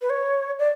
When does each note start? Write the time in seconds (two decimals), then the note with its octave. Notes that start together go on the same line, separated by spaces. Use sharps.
0.01 B4
0.10 C#5
0.59 D5